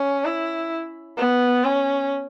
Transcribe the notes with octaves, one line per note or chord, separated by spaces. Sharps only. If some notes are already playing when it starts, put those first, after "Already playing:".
Already playing: C#4
E4
B3
C#4